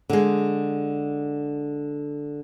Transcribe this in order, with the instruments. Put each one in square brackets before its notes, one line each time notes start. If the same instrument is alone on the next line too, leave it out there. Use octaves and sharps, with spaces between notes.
[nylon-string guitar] D3 G#3